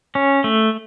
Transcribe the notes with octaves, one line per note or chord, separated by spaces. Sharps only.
C#4
A3